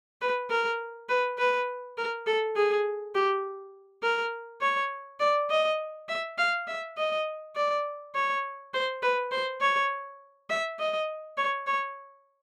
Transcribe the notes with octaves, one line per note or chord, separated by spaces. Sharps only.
B4
A#4
B4
B4
A#4
A4
G#4
G4
A#4
C#5
D5
D#5
E5
F5
E5
D#5
D5
C#5
C5
B4
C5
C#5
E5
D#5
C#5
C#5